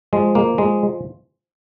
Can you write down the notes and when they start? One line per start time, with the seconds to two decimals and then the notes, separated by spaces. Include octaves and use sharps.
0.13 F3 G#3
0.35 A#3
0.58 F3 G#3